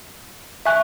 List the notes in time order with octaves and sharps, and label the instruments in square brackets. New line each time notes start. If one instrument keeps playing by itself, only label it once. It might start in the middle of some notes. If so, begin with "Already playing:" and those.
[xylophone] E5 G#5 C#6 F#6